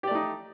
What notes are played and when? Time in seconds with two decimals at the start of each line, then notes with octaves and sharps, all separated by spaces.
0.03 G4
0.07 D5
0.11 A3
0.15 D#4